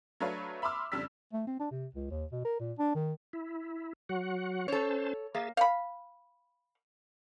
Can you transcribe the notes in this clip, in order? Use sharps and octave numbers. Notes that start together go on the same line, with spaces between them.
F#3 A3 D4 B4 C#5 F5
E5 B5 C6 D6 E6 F6
F2 C#3 G3 D4 E6 B6
A3
C4
D4
C3
C#2
D#2
B2
A#4
A#2
D4
D#3
E4
F#3 F#4 F#5
C#4 A4 C5 C#5 A5
A#3 G#4 E5 A6
F5 B5